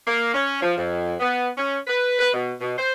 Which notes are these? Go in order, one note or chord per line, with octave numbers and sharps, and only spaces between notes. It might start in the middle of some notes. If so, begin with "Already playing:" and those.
A#3
C#4
F3
F2
B3
C#4
B4
B4
B2
B2
C5